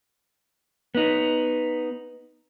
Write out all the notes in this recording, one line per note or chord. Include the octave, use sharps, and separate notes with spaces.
B3 D#4